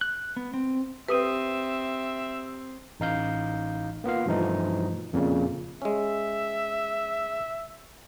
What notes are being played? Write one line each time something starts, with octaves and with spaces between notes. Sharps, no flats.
F#6
B3
C4
C4 G4 B4 E5 D#6 D#7
A1 D#4 F5 G6
A#3 B3 F4 F5
G2 B2 E3 F3 A3 D#4
F2 A#2 C#3
G#3 C#4 E5